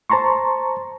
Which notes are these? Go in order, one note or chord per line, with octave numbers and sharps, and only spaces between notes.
C5 A5 A#5 C6 C#6